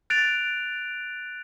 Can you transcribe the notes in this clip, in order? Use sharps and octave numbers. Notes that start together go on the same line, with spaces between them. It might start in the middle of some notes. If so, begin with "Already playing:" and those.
F#6 A6 D7 F7